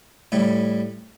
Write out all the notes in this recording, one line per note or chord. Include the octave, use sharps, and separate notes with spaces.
A2 G3